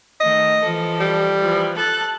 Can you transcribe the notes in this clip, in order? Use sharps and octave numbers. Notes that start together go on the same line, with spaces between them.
D#3 A3 D#5
E3 F3 A4
G3
E3 F3
A4 A5 F#6